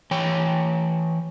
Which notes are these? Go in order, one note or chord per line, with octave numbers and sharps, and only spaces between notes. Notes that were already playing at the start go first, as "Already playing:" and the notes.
E3 C#5 G5